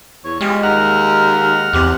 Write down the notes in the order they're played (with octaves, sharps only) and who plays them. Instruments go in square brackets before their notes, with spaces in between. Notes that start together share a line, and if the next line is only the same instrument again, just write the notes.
[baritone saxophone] E2 [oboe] C#5
[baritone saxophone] G3 [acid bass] G#3 [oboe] F4
[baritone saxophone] D#2 [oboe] A#4 [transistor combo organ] F#5 F6
[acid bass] E2 [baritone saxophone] C3 [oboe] G4